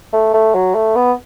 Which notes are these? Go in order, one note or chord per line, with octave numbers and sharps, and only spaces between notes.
A3
A3
F#3
A3
B3